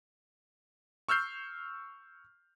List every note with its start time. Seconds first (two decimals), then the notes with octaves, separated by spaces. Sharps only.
1.09 C#6 E6 F6 G6 C7